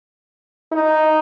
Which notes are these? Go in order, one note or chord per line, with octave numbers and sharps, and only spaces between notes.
D#4